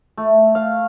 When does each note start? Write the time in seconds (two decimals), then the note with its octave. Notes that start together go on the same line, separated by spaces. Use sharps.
0.18 A3
0.55 F5